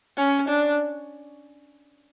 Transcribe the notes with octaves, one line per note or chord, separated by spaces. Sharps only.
C#4
D4